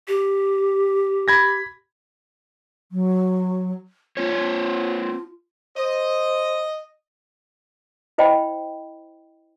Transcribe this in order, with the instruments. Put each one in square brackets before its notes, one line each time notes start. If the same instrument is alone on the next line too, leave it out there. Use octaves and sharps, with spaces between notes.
[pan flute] G4
[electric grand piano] B5 G#6 A#6
[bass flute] F#3
[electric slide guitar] A#3 C4 C#5 [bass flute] F4
[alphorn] C5 [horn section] D#5
[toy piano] E4 C5 D#5 E5 G5 B5